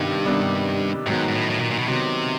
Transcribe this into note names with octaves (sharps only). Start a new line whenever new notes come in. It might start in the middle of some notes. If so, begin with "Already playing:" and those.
Already playing: G2 C3 D#3 G3 B3
C3 D#3 G3 B3 D4
G#2 D#3 F#3 B3
G#2
A2
A2
A#2
A#2
B2
C3 D#3 F#3 B3